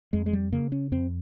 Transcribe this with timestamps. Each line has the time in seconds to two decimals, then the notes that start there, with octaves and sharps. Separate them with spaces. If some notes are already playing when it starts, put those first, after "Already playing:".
0.13 F2 G#3
0.26 G#3
0.33 G3
0.52 C#3 A#3
0.72 C#4
0.92 F2 C4